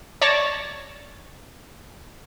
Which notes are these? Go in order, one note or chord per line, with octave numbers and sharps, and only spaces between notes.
C#5 D5 A5 A#6